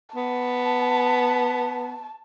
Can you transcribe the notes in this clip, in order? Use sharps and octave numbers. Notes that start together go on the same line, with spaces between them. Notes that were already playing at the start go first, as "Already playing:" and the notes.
B3 A5